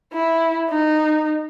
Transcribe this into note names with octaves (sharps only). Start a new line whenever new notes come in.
E4
D#4